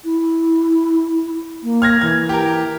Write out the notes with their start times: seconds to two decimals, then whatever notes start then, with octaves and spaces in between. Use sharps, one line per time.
0.05 E4
1.63 A#3
1.82 F6 G#6 A#6
2.01 E3 G#6
2.29 G4 A#4